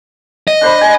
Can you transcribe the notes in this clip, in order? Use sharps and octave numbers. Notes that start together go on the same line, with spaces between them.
D#5
D4 C5 B5
G#5